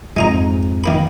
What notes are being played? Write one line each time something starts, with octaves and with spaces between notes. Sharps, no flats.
F2 G#2 G#3 D#4 A#5
D#3 A#3 B5